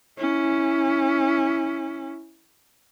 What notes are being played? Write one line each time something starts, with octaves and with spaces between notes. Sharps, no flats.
C#4 E4